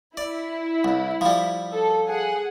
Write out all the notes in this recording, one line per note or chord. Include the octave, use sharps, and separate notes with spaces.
E4 D5
C2
F3 G3
A4
G#4 F#5